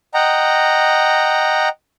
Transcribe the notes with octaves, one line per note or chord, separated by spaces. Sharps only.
D#5 F#5 G5 A#5